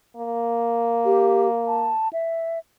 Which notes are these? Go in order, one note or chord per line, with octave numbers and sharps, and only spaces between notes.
A#3
G4
A5
E5